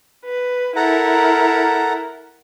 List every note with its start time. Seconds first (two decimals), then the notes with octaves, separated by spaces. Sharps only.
0.25 B4
0.76 E4 A4 A#4 F#5 A#5